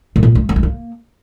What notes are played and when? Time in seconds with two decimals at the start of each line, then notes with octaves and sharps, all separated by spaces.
0.16 A2
0.23 A#2
0.35 A3
0.49 A#3
0.56 A3
0.63 A#3